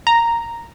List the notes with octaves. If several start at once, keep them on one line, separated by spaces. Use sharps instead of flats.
A#5